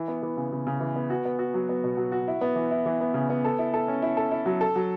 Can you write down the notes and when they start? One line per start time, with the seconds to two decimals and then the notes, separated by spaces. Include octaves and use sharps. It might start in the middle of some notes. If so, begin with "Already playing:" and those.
Already playing: E3
0.08 B3
0.23 E3
0.37 C#3
0.52 C#3
0.67 C#3
0.80 E3
0.96 B3
1.10 F#4
1.25 B3
1.39 F#4
1.54 F#3
1.69 B3
1.84 B2
1.97 F#3
2.12 F#4
2.28 E4
2.41 B3
2.56 E3
2.70 E4
2.86 E3
3.01 B3
3.14 C#3
3.30 B3
3.45 A4
3.59 E4
3.74 A4
3.88 C#4
4.02 E4
4.17 A4
4.31 E4
4.46 F#3
4.61 A4
4.76 F#3